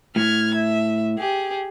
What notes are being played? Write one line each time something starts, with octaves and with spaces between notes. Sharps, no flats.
A2 F6 G#6
E5
G4 G#4